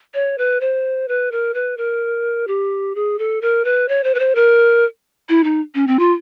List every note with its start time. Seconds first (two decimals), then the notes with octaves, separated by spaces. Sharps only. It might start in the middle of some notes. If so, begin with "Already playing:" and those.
0.14 C#5
0.38 B4
0.60 C5
1.08 B4
1.31 A#4
1.54 B4
1.77 A#4
2.47 G4
2.95 G#4
3.19 A4
3.41 A#4
3.65 B4
3.88 C#5
4.04 C5
4.15 B4
4.19 C5
4.35 A#4
5.29 E4
5.44 D#4
5.75 C#4
5.87 C4
5.99 F4